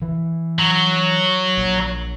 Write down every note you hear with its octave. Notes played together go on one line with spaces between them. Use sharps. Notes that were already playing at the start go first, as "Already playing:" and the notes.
E3
F#3
A#1